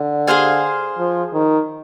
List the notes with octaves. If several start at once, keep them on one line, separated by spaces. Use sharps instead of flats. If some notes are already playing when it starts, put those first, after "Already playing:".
Already playing: D3
G#4 C5 F5 G#5
F3
D#3